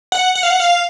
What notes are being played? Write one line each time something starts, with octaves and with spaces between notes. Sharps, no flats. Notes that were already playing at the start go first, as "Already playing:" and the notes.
F#5
F#5
F5
F#5
F5